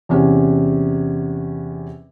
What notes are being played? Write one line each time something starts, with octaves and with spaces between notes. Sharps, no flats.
E2 C3 C#4